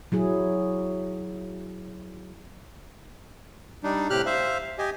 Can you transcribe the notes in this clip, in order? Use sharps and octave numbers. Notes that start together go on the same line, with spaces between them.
F#3 E4 G#4
G3 D4 D#4
A2 C3 G4 F6 F#6
C5 E5 F5
G4 D#5 G#5